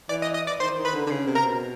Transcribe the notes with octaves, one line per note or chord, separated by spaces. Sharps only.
E3 D5 D6
D#5 D#6
D#5 D#6
D5 D6
D#3 C5 C6
D#3
B4 B5
D3
D3
C#3
C3
A#4 A#5
B2